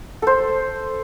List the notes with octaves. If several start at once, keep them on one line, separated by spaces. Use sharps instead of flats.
A4 C5